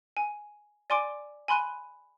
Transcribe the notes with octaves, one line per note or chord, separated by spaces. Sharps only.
G#5
D5 G#5 C6 D6 D7
G#5 B5 C6 F#6 D#7